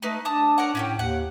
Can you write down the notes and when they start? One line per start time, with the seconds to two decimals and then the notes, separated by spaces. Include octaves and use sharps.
0.03 A3 D#4 B4
0.25 D4 A5 D#6
0.58 A#4 C#5 F#5
0.75 A2 C#4 F#4 G4
0.99 D#2 F#5